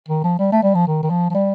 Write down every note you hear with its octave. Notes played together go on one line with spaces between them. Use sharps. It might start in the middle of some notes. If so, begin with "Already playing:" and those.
D#3
F3
G3
A3
G3
F3
D#3
D#3
F3
F3
G3